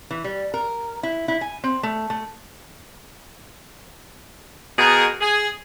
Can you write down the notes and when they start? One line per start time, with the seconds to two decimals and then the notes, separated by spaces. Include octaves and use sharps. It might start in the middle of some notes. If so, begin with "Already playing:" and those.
0.11 E3
0.24 G3
0.54 A#4
1.03 E4
1.28 E4
1.41 G#5
1.64 C4
1.83 A3
2.10 A3
4.78 B2 G#4 A#4
5.21 G#4